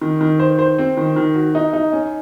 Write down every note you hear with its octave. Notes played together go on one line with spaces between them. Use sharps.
D#3
D#3
C5
C5
C4
D#3
D#3
F#4
D#4
D#4
C#4